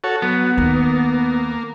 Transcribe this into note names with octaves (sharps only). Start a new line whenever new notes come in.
F#4 A4 C#5
F#3 B3
D#2 D#3 A#3